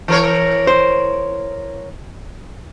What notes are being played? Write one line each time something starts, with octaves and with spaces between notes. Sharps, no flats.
E3 A#4 C#5
C5